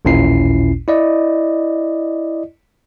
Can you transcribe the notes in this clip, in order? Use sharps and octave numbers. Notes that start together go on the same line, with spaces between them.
A1 D#2 A#2 C#4 E4 C7
E4 D5 D#5